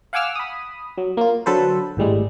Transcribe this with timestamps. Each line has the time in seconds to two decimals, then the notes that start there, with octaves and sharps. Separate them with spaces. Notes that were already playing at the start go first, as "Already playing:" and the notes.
0.13 F5 F#5 G#5 D6 E6 F6
0.35 B5 D#6
0.98 F#3
1.17 A#3 F4
1.46 D3 F#3 A4 B4 C5
1.97 G#1 A2 G3 G#3